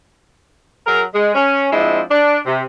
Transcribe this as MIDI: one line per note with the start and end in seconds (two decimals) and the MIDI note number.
0.87 1.04 54
0.87 1.04 68
0.87 1.04 70
1.13 1.32 56
1.35 1.70 61
1.73 2.02 53
1.73 2.02 56
1.73 2.02 60
1.73 2.02 62
1.73 2.02 64
2.11 2.39 62
2.46 2.63 48